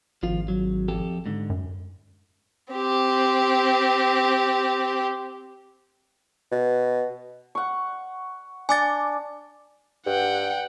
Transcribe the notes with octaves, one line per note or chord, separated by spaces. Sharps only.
G#1 F3 F4
F#3
F2 G4 A4
G#2 D3
F#2
C4 G4
B2
F#5 C#6
D4 G#5 D6 A6
G2 F#5 G5